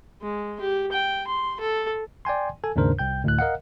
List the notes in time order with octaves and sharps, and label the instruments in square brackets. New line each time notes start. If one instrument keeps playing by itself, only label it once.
[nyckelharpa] G#3
G4
G5
C6
A4
[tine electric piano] D5 G5 G#5 C6
A4 G#5
D#2 G#2 C#3 D4 A#4 C5
C2 G5 G6
D2 A2 F#6
A#4 D#5 F5 F#5